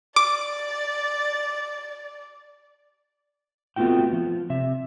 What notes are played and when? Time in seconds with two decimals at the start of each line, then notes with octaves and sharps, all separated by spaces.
0.16 D5 D6
3.76 A3 B3 C4 F4 F#4 G5
4.13 F3
4.50 C3 E5